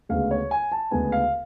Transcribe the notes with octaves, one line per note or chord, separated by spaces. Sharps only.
D2 C#3 G#3 B3 F5
C#5
G#5
A5
D2 C#3 G#3 B3 G#5
F5